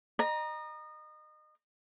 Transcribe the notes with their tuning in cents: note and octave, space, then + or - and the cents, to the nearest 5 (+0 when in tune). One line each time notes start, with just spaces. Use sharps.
D#5 -30 A#5 +20